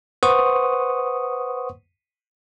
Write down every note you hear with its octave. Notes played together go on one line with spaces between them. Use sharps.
B4 C5 F#5 C6 C#6 D#6